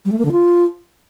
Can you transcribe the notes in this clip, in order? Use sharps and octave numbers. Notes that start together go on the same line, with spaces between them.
G3
A3
A#3
D3
F4